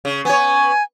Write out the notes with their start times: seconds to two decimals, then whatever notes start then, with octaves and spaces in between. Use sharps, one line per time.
0.05 C#3
0.25 B3 C#5 G#5